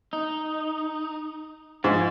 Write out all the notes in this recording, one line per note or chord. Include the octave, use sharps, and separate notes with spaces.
D#4
G#2 F3